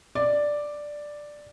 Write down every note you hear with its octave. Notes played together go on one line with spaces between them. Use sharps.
D5